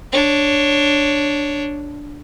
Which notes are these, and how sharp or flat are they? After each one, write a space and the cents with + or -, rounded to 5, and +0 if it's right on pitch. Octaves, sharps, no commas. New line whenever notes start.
D4 +0 C#5 +0